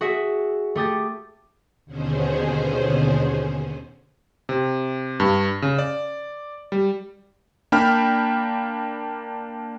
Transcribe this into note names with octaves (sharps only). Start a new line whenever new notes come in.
F#4 G#4 E5
A3 G4 D#6 A6
D#2 B2 D3 C#4 G#4 C5
C3
G2
C#3
D5
G3
A#3 D4 G5 B5 F6